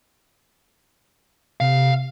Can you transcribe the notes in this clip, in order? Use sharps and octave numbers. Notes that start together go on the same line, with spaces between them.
C3 F5